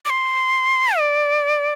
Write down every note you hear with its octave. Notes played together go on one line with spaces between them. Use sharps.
D6
C6
D5